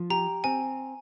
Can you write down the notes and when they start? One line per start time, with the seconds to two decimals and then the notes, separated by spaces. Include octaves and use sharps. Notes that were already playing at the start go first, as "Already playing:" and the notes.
Already playing: F3
0.10 G4 A#5
0.44 C4 G#5